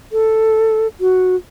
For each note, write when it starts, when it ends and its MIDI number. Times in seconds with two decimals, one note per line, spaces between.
0.12 0.87 69
1.00 1.35 66